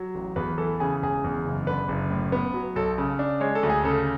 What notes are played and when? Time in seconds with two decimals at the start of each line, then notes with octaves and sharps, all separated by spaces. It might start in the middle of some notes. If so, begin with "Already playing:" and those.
Already playing: F#3
0.15 A1
0.36 E2 B4
0.58 E3 A4
0.80 C#3 G#4
1.02 E1 G#4
1.24 E2
1.45 F#1
1.66 D3 B4
1.88 F#1
2.10 A2
2.32 B3
2.54 F#3
2.76 B1 A4
2.98 C#3
3.19 D4
3.40 G#3 C#5
3.55 A4
3.63 D2
3.70 G#4
3.84 C#3 A4